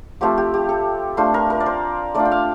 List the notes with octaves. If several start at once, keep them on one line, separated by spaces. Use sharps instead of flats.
F3 A3 C4 F4 G4
G4
G4
A4
A3 D4 F4 C5
A#4
A#4
D5
C5
A3 D4 F4 D5
G5
F5